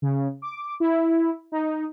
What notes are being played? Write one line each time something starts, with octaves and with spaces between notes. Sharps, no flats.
C#3
D6
E4
D#4